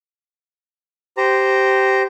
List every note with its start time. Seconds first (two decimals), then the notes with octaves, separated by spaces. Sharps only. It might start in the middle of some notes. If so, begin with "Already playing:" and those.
1.17 G4 C5 A#5